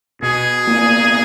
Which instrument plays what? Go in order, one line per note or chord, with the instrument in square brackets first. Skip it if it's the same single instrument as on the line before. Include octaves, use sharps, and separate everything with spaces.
[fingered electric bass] B2 [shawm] G#4
[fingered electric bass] A#3